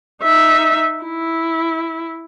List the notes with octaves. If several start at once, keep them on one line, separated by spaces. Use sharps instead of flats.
D#4 E5
E4